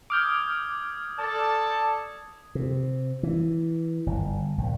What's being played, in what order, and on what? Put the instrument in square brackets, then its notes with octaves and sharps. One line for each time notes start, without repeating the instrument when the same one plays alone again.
[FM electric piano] D6 F6 G6 [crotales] D#6 G#6
[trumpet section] A4 D5 A5
[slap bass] C3
E3
G1
A#1